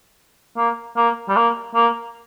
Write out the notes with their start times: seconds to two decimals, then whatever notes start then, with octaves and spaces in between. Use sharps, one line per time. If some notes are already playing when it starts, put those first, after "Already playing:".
0.57 A#3
0.97 A#3
1.29 G3
1.36 A#3
1.75 A#3